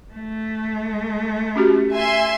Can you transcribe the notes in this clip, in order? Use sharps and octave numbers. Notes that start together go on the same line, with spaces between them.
A3
C#4 F#4 G4
E5 G#5 C6